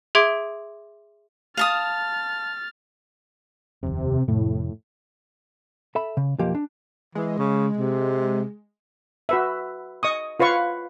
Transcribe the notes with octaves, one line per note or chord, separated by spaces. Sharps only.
G#4 E5 C6 D6 G#6 D7
F5 A5 D#6 F6 A6
F1 D#2 C3
F2 A2 C3
A4 E5 B5
C#3
B1 F2 F3 A#3 G4
D4
E3 G#3
C#3
C3
F#4 B4 E5
D#5 C#6 D#6
F4 B4 C#5 F5 C#6